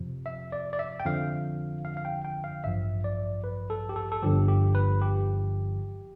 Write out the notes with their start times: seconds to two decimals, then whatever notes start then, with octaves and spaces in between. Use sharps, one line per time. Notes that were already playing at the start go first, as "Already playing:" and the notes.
Already playing: F2 C3 F3
0.26 E5
0.52 D5
0.73 D5
0.79 E5
1.00 G5
1.05 F2 D3 F3 F5
1.85 F5
1.97 F5
2.05 G5
2.25 G5
2.44 F5
2.64 A1 G2 F3 E5
3.04 D5
3.44 B4
3.70 A4
3.89 G4
3.96 A4
4.12 A4
4.22 G1 G2 D3 F3 G4
4.48 G4
4.75 B4
5.02 G4